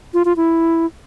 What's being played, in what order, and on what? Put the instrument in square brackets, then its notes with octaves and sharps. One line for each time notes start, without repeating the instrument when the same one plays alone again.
[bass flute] F4
F4
E4